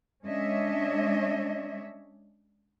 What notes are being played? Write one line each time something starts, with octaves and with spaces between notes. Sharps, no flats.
G#3 C#4 D4 C#5 D#5 E5